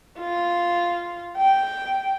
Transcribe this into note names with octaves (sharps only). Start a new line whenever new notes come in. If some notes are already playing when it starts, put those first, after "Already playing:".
F4
G5